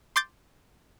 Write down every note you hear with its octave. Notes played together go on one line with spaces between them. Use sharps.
C6 D6 G6 A6